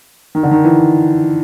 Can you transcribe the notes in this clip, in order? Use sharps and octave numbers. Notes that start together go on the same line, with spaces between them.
D#3
D3
D#3
E3